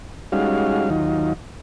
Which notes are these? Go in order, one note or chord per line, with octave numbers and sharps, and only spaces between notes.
G3 G#3 C#4 D#4 F#4 F5
D#2 D#3 F#3 D#4 F4